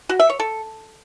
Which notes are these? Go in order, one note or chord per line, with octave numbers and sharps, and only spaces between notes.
F#4
E5
C#5
A4